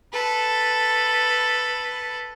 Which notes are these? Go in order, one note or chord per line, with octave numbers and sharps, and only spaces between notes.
A4 B4